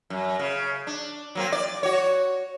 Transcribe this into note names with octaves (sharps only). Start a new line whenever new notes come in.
F#2
C#3
D4
F#3 A#3 C4
D5
F#4 C#5